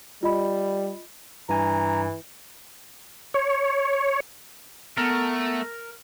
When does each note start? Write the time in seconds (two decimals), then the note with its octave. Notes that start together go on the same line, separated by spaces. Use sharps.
0.23 G3 F4 D#5 B5
1.49 G2 E3 G#5 A#5
3.34 C#5
4.97 A3 B3 A#4